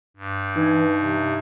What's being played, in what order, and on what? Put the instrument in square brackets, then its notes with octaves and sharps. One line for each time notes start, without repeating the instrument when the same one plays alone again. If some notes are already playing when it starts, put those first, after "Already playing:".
[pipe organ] G2
[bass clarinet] E3 [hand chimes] D#4
[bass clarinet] C3